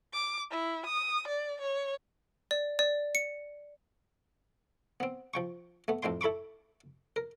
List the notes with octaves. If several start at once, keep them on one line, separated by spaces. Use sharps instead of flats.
D6
E4
D#6
D5
C#5
D5
D5
C#7
B3 C4
F3 G5 C#6
A3 B3
F2 A2 A3 G5 C6
E4 A4 B5 C#6 D6
A#4